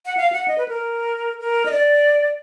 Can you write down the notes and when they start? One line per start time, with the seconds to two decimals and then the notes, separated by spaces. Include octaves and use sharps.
0.06 F#5
0.17 F5
0.32 F#5
0.48 D#5
0.58 B4
0.68 A#4
1.40 A#4
1.66 D#5
1.71 D5